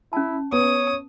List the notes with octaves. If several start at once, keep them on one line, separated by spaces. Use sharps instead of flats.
C#4 E4 A5
B3 C#5 D#6